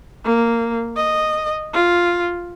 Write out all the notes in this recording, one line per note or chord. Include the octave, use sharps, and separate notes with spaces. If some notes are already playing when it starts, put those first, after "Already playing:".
A#3
D#5
F4